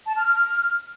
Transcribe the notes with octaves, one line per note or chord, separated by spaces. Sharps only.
A5
F6
F6